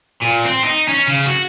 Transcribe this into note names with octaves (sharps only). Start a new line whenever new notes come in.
A#2
C4
D#4
C#4
C#3
F#4